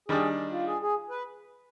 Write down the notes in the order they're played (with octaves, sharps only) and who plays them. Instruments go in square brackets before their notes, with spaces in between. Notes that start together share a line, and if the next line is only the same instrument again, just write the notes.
[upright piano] D#3 G3 D4 [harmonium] G#4
[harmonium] F4
G#4
G#4
B4